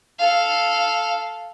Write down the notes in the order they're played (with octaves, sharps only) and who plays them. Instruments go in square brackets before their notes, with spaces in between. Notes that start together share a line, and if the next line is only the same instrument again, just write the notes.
[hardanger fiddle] A4 F5